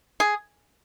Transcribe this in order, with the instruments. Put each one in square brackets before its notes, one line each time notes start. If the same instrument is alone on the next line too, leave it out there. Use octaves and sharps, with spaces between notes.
[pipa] G#4